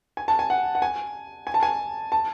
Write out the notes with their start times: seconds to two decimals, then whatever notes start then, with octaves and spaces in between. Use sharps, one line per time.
0.17 G#5
0.28 A5
0.39 G#5
0.50 F#5
0.75 F#5
0.82 G#5
1.47 G#5
1.54 A5
1.63 G#5
2.12 A5